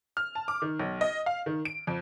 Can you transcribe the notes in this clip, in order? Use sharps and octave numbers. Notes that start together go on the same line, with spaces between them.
F6
A5
D6
D#3
B1
D#5
F5
D#3
D7
F2